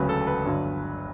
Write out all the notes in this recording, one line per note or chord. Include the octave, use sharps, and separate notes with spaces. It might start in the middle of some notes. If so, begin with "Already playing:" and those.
Already playing: E1 D2 C#3 F#3 B4
A4
B4
G1 G2 D3 F#3